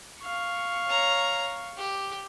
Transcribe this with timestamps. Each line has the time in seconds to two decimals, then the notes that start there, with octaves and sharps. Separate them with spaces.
0.21 F5 C#6
0.86 C#5 A#5
1.78 G4